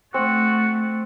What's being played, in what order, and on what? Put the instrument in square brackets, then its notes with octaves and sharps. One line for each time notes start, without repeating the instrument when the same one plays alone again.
[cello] A3 [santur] C4 [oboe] F#4